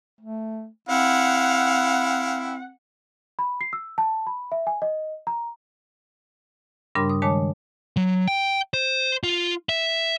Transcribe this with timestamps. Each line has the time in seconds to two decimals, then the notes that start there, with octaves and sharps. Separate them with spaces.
0.21 A3
0.89 C4 E4 F5 F#5
3.39 B5
3.61 C7
3.73 E6
3.98 A5
4.27 B5
4.52 E5
4.67 G#5
4.82 D#5
5.27 A#5
6.95 G2 C#3 G3 D4 A#4 C6
7.09 D#6
7.22 D#3 G#3 C#5 A5 D6
7.97 F#3
8.27 G5
8.74 C5
9.23 F4
9.69 E5